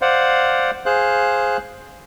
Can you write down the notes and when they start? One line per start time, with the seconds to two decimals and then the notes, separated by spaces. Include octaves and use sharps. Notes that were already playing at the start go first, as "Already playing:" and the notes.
0.02 C5 D5 F5 F#5
0.86 G#4 C5 F5 F#6